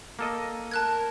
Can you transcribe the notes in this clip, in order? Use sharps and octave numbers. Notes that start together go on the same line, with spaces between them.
A#3 A4 D#5
A#4 A5 F#6 G#6